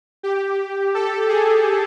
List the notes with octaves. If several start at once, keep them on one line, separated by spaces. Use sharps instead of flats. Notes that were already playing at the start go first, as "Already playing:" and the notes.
G4
A4
G#4